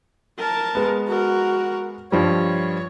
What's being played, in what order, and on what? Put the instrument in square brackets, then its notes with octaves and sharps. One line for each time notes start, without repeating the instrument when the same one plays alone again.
[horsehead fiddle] A#4 A5
[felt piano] G#3 B3
[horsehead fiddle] F#4 A#4
[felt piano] G2 F3 G3 [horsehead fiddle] C#5